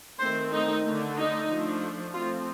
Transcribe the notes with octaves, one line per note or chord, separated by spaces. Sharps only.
D#3 A3 C4 C5
D#4
D3 A3 D4
D#4
F3 A3 D4
F3 A3 C4 F4